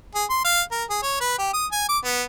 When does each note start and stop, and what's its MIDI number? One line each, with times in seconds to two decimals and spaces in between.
0.15 0.25 68
0.30 0.40 84
0.44 0.61 77
0.71 0.83 70
0.90 0.98 68
1.03 1.19 73
1.21 1.34 71
1.38 1.51 67
1.53 1.66 87
1.72 1.84 80
1.89 1.98 86
2.04 2.22 59